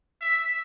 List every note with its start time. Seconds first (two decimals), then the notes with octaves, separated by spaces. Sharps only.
0.21 E5